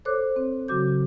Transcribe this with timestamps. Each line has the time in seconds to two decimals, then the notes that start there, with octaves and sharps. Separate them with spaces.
0.05 A4 C5 C#5 D6 F#6
0.36 C4
0.68 C#3 F#3 F#4 D6 G6